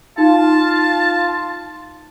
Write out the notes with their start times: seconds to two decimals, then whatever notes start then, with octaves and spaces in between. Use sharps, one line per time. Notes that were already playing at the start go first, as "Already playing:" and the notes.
0.18 D#4 F4 A5